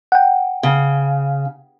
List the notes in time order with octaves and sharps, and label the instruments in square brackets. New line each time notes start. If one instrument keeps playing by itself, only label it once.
[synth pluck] F#5 G5
[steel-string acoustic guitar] C#3